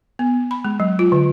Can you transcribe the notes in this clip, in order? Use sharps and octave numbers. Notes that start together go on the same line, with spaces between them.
B3
B5
G#3
F#3
F4
D3